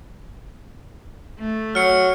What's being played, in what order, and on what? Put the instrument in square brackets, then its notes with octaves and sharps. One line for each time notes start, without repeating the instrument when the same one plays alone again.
[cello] A3
[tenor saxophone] F#3 [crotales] F6 C#7